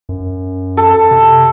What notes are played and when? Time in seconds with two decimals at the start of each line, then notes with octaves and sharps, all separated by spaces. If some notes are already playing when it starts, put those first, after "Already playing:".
0.09 F#2
0.77 A4
1.11 C3